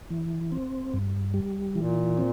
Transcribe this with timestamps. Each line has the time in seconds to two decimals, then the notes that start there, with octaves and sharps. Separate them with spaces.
0.11 E3
0.52 C4
0.94 G2
1.34 G3
1.75 A#2 E3
2.18 C4